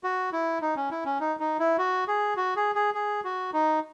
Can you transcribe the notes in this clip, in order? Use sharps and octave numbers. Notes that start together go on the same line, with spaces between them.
F#4
E4
D#4
C#4
E4
C#4
D#4
D#4
E4
F#4
G#4
F#4
G#4
G#4
G#4
F#4
D#4